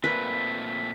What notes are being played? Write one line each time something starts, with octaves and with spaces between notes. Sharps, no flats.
A#2 A3 C4 A#4 B4 B6